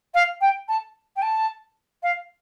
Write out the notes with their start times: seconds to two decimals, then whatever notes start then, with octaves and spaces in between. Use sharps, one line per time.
0.14 F5
0.41 G5
0.68 A5
1.16 G5
1.22 A5
2.03 F5